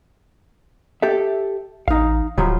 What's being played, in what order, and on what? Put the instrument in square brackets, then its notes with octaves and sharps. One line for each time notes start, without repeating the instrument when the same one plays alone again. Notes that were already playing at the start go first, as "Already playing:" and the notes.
[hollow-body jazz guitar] G4 A4 E5
[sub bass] A1 [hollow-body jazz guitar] D#4 F5
[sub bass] D1 [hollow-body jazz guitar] C#3 F3 F#3